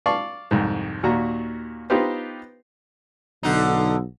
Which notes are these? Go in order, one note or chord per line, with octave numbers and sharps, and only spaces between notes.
D5 F5 A5 C#6
C2 F2 G#2
D#2 A#2 F#4 A#5
B3 D#4 F4 G4 B4 C5
B1 D3 D#4